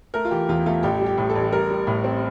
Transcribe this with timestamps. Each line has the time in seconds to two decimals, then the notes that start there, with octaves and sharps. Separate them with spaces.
0.14 A3 A#4
0.25 F4
0.31 E3 G4
0.49 E2 F4
0.66 A3 F4
0.83 A1 G4
1.01 G3
1.06 G4
1.18 A2
1.30 A4
1.36 A1
1.52 G3 A#4
1.70 G3
1.87 A2
2.04 C4